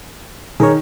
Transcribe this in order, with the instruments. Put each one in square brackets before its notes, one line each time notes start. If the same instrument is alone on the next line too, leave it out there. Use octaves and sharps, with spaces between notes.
[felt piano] D#3 [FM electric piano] G#4 A#4 C#5